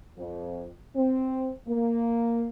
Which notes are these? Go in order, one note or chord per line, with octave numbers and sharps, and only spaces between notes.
F2
C4
A#3